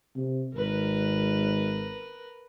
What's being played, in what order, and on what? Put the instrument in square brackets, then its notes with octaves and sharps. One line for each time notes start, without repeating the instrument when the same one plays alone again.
[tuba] C3
[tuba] G#1 [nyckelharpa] A#4 B4